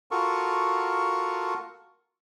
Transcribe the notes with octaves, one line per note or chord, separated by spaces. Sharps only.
F4 F#4 A4 A#4 C#6